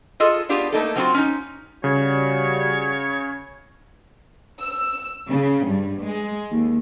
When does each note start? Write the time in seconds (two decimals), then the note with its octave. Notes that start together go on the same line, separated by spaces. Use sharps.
0.20 F4 G#4 A4 D#5
0.49 B3 D4 F4 G4 G#4
0.72 A3 A#3 D#4 A4
0.96 F#3 G#3 C4 C#4 F4 F#4
1.14 C#4 D#4
1.84 C#3 G3 F#4 C#5
4.61 E6
5.28 C#3
5.65 G2
6.04 G#3
6.51 D#2